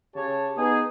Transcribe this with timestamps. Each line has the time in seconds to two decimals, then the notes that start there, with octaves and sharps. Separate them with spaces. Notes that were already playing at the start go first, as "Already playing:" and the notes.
0.15 C#3 G4 C#5 A5
0.57 B3 D#4 G#4